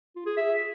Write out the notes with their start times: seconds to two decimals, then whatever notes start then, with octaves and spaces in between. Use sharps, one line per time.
0.16 F4
0.26 G#4
0.37 E5